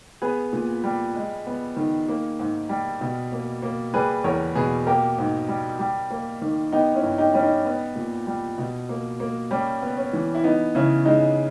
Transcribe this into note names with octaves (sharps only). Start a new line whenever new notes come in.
B3 G#4 B4
A#2
G3
G#3
B3
D#3
A#3
G#2
G3
B2
A#3
A#3
G3 G#4 B4
E2 A#4 C#5
B2 G#4 B4
A#3 G4 A#4
G#2
G3
G3
A#3
D#3
B3 D#4 G4
C#4 E4
G2
D#4 G4
G3 C#4
D#4
B3
A#2
G3
B2
A#3
A#3
G3 C#4
B3
C#4
E3
E4
B3 D#4
C#3 C#4 E4
G#3 D#4